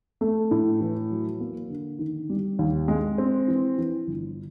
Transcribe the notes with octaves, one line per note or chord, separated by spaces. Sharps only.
A3
A2
E3
F#3
A#3
D3
D#3
G3
D#2
G#3
C4
E3
E3
G1